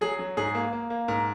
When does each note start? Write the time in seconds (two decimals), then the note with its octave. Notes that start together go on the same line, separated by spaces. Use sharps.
0.01 F#3 G#4
0.19 F#3
0.37 G#2 G#4
0.55 A#3
0.73 A#3
0.90 A#3
1.08 G#2 A#4